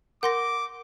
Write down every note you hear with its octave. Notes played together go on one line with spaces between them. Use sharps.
A#4 F#5 C6 D6 A#6